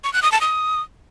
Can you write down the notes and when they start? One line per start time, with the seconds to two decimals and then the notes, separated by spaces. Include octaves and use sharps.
0.04 C#6
0.13 F#6
0.23 D#6
0.32 A5
0.41 D#6